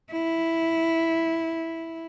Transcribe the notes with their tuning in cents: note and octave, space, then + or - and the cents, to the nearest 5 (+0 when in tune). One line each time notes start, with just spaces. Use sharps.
E4 -5